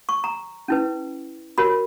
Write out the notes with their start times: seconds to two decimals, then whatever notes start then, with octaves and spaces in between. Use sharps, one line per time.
0.09 C#6
0.24 A#5
0.68 C#4 E4 B4
1.58 F#4 A#4 C#5 B5